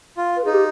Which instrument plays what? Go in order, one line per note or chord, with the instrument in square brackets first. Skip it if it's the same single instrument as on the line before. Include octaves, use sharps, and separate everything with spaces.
[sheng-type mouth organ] F4
[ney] B4
[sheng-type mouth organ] D#4 [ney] G#4
[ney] G4